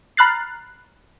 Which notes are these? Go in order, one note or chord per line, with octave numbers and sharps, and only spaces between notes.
A#5 B5 F6 F#6 A6 C7